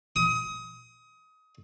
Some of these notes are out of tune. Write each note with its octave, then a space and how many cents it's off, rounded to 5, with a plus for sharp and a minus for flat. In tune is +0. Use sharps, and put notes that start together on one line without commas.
D#6 +25